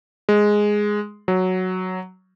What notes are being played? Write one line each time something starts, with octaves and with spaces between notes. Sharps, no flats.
G#3
F#3